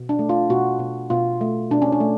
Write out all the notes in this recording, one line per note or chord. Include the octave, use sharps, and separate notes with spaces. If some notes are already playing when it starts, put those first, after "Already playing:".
Already playing: B2
D4
A3
F4
B2 F#4
B2
B2 F4
A3
B2 D4
C#4
D4
A3